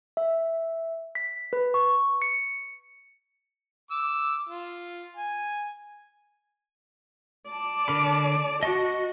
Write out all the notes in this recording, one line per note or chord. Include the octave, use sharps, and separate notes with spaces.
E5
B6
B4
C#6
C#7
D6 E6
F4
G#5
D5 A5
D3 A#4 B5
F#4 D#5 A5 C#6